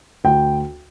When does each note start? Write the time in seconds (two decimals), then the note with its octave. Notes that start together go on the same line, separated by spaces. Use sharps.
0.24 D2 G5